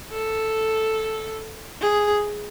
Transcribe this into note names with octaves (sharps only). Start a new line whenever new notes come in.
A4
G#4